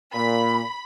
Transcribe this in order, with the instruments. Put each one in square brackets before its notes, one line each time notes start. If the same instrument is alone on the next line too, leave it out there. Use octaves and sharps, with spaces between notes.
[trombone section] A#2 [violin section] B5